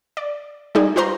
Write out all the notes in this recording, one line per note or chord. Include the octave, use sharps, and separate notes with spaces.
D5
G3 G#3 D#4 G#4 D5
F4 G4 B4 C5 A#5 C6